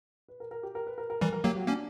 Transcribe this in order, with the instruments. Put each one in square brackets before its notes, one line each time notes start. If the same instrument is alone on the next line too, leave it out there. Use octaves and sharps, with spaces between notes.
[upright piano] B4
A#4
A#4
G4
A#4
B4
A#4
A#4
[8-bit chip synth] E3 G3 [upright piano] A#4
[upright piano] A#4
[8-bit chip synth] F#3 A#3 [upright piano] G4
[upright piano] F#4
[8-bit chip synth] A#3 C#4 [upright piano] D4